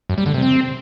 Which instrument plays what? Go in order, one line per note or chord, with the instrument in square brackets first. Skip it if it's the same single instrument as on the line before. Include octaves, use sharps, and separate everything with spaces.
[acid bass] F#2
G3
D3
C3
C4